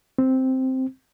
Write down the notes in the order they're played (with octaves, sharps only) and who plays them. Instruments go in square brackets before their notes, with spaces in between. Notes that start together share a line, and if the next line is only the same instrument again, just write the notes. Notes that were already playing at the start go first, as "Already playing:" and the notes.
[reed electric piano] C4